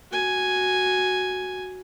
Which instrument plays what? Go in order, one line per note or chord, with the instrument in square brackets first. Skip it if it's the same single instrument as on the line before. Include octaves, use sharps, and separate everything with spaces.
[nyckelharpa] F#4 G#5